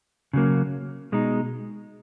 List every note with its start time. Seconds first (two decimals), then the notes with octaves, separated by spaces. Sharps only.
0.33 C#3 F#3 A#3
1.12 B2 G#3 D#4